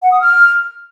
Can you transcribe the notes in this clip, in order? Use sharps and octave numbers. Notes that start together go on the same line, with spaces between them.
F#5
D#6
F6